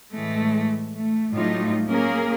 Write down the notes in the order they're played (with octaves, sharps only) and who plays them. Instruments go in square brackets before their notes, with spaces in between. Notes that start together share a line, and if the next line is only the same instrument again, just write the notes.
[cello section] A2 E3 G#3 A3
A3
A2 F#3 G3 A3 D#4 F4
A#3 C#4 G#4 A#4